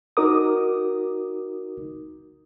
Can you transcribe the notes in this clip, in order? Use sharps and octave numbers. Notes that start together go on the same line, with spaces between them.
D#4 F#4 A#4 D6 D#6